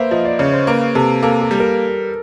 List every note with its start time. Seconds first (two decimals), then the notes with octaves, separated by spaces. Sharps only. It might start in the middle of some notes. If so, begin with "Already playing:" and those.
Already playing: A#3 B4 C5 E5
0.11 F3 D#5
0.25 D5
0.39 C#3 C#5
0.53 C5
0.67 A#3 B4
0.95 C3 A4
1.23 A#3 A4
1.42 A4
1.51 G3
1.60 A#4